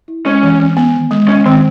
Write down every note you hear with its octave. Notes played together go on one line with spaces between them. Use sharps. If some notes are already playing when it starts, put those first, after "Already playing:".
E4
G#3 C#4
E3
E3
B3
D#3
G#3
G#3 C#4
D#3 C4